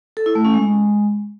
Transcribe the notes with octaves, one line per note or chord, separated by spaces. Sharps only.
A4
E4
A3
C#4
G#3